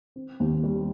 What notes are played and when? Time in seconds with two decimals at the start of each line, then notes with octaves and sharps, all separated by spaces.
0.16 C4
0.40 D#2
0.64 G3